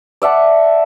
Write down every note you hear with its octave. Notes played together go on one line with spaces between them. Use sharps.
D5 E5 F#5 A5